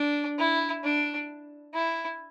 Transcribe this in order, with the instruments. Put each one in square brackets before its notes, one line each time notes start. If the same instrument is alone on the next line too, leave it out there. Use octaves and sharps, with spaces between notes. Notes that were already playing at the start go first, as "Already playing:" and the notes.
Already playing: [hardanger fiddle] D4
E4
D4
E4